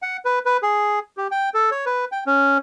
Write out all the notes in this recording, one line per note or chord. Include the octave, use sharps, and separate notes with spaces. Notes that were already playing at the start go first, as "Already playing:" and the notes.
F#5
B4
B4
G#4
G4
G5
A4
C#5
B4
G5
C#4